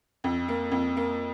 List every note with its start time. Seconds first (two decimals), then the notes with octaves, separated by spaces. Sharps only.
0.24 F2
0.49 A#3
0.72 F2
0.97 A#3